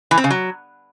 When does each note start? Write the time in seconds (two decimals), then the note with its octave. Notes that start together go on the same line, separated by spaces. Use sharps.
0.11 E3
0.18 C4
0.24 C#3
0.30 F#3